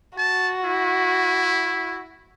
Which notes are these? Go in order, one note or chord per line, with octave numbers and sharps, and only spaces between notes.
F#4 A5
E4